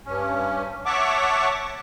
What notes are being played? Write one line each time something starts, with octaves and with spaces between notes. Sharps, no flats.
G2 C#4
C#5 E5 F#5 A5 C#6 D6